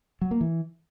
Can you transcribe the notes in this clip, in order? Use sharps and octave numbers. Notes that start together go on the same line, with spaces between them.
F#3
A#3
E3